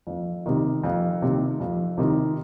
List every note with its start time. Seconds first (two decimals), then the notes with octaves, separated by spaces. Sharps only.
0.07 F2
0.46 C3 D#3
0.84 F2
1.22 C3 D#3
1.60 F2
1.98 C3 D#3